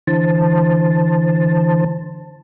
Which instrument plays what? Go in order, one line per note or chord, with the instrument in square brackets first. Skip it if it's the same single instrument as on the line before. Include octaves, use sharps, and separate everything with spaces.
[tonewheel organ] D3 E3 C5 A5